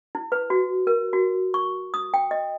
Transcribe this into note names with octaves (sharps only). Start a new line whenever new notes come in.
E4
B4
F#4
A#4
F#4
C#6
D#6
G5
D#5